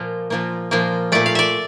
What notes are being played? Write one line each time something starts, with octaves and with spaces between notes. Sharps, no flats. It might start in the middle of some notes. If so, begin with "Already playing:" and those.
Already playing: A#2 F3 A#3
A#2 F3 A#3
A#2 F3 A#3
A#2 A3 D5
F5
D5 E5